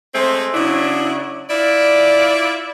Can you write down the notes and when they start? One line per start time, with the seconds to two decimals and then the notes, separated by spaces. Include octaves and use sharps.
0.14 G#3 A3 C4 C5
0.54 C#3 F#3 D4 E4
1.50 E4 F4 D5